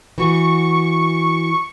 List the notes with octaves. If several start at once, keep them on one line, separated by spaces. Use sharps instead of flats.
E3 F#4 C#6